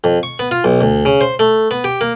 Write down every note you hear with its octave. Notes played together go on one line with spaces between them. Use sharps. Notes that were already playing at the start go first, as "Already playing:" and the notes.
F2
C#6
B3
F4
B1
D2
C#3
C5
A3
B3
G4
A#3